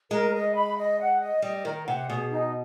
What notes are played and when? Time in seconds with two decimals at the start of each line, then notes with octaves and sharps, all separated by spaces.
0.11 G#3 A#4
0.33 D#5
0.55 B5
0.77 D#5
0.99 F#5
1.20 D#5
1.42 G3 D#5
1.65 D#3 A#4
1.87 C3 F#5
2.09 B2 G#4
2.31 D#4